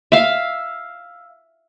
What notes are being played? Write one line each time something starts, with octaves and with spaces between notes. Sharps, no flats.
E5 F5